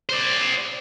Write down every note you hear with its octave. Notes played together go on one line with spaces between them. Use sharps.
C5 D5